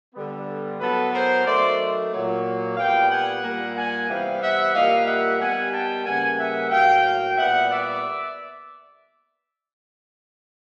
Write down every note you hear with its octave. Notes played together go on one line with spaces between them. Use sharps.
D3 G3 B3
A2 F#3 B3 A4 B4
A#4 C5
D#3 F#3 A3 C5 D5
A#2 F#3 A#3
A#2 G3 B3 F5 G5
F#5 G#5
A#2 G3 A#3
F#5 G#5
C3 E3 G3 B3 F5 G5
E5 F#5
A#2 G3 A#3 D#5 F5
E5 F#5
D#3 G3 B3 F#5 G#5
G5 A5
C#3 E3 G3 A#3 F#5 G#5
E5 F#5
A2 F#3 A#3 F5 G5
A#2 G3 B3 E5 F#5
D5 E5